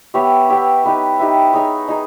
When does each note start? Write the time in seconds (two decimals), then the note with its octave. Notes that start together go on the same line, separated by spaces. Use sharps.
0.14 B3 G4 C#5 E5
0.49 B3 G4 C#5 E5
0.84 D#4 G4 B4 E5
1.19 D#4 G4 B4 E5
1.53 D#4 G#4 C#5
1.89 D#4 G#4